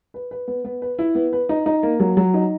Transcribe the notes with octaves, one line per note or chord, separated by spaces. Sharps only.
B4
B4
B3
B3
B4
E4
B3
B4
D#4
D#4
A#3
F#3
F#3
D#4